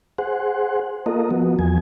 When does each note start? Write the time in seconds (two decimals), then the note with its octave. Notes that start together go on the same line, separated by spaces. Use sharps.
0.18 G#4 C5 F#5
1.06 A#3 F4 A4 A#4 D#5
1.31 F3 B3 F#4
1.59 E2 F3 G#5